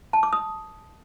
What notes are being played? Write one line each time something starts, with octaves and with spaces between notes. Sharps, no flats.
A5
D6
D#6